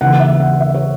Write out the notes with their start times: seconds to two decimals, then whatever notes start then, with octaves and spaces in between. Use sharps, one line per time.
0.01 D#2 C#3 E3 F#5
0.20 E5
0.40 F#5
0.60 E5
0.75 C#5